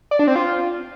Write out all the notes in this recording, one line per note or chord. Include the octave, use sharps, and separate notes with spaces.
D5
D4
C4
F4